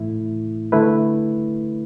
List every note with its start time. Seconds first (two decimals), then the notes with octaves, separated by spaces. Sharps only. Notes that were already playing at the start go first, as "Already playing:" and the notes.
Already playing: A2 E3 A3 E4
0.72 D3 A3 E4 B4